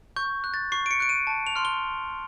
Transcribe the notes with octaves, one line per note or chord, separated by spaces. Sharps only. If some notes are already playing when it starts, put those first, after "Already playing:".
C#6 G6
F#6
A6
C#6 C7
D7
C#7
F#6 D7
D#7
A5
F7
C6 F6
G7